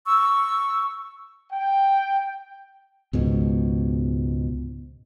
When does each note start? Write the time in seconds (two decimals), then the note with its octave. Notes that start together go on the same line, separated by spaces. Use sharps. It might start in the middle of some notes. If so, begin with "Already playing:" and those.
0.07 C#6 E6
1.50 G5
3.13 C#2 G#2 B2